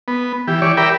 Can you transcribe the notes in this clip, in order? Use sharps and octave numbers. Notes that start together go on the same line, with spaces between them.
B3
E3 G4
E3 C#5 D5
G4 A#4 D5 E5 G5 B5